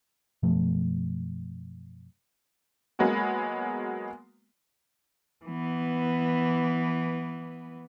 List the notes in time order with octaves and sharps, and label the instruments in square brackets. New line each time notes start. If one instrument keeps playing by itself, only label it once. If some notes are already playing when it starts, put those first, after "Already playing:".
[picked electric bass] F#2 B2 F3 A3
[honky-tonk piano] F#3 G#3 A#3 B3 F#4
[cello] E3 B3